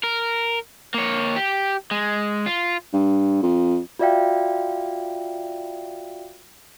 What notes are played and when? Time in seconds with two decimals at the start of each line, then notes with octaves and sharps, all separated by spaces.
0.03 A#4
0.94 A#3 C#5
1.36 G4
1.91 G#3
2.46 F4
2.93 G2
3.42 F2
3.99 F4 F#4 D5 E5 F5 G5